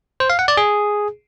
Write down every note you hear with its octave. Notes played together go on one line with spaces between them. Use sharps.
C5
F5
F#5
D5
G#4